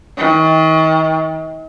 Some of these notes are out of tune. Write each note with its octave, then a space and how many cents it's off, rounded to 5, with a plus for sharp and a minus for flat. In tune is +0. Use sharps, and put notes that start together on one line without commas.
D#3 +40